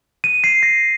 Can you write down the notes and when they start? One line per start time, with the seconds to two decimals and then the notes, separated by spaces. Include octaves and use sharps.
0.24 D#7
0.44 C7
0.63 A#6